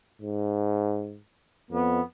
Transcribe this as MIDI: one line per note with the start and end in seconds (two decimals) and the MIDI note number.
0.22 1.19 44
1.71 2.01 41
1.71 2.02 59